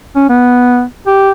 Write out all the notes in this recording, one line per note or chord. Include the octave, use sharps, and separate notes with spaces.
C#4
B3
G4